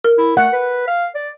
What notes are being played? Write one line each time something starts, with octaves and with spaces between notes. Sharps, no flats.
A#4
E4
A3 F#5
B4
F5
D5